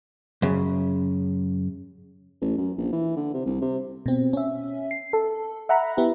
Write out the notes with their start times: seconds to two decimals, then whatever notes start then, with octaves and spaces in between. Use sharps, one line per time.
0.42 F#2 C#3
2.41 A1
2.58 F#2
2.78 A#1
2.93 E3
3.16 D3
3.34 C3
3.46 C2
3.62 C3
4.06 B2 C4
4.33 C#4 E5
4.91 C7
5.13 A4
5.69 E5 F#5 A#5 B5
5.97 B3 E4 G4